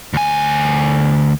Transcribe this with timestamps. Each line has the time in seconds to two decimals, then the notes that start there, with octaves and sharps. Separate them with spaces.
0.13 D2 G#5